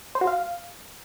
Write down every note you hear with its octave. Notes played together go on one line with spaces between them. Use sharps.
C5
F#4
F5